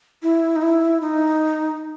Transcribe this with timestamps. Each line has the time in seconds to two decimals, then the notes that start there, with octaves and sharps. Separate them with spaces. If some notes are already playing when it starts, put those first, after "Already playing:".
0.22 E4
0.56 D#4
0.62 E4
1.01 D#4